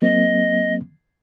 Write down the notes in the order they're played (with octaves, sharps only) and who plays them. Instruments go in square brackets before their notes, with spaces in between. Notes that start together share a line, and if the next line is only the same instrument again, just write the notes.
[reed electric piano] F#3 A#3 C4 [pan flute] D#5